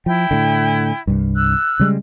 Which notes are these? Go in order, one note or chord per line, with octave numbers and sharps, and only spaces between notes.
F3 E4 G5
A2 D3
C2 G2
E6 F#6
C#3 G3 G#3